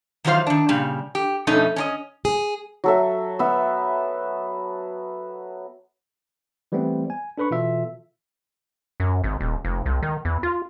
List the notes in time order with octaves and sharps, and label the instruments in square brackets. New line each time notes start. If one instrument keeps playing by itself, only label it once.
[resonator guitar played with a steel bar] D#3 E3 F#3 F4 C5 F5
D#3 D4
A#2 C#3 G3
G4
F2 B2 A3 C#4 D#4
C#4 D4 D#5
[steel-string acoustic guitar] G#4
[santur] F#3 A4 E5
B3 E5
[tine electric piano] E3 G3 A3 B3 C4
G#5
D4 A4 B4 B5 C#6
B2 E3 F4 A4 E5
[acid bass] F#2
G#1
D#1
F1
C2
D#3
E2
F4